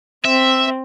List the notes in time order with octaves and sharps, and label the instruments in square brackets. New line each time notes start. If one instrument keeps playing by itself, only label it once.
[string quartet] C4 [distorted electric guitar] E5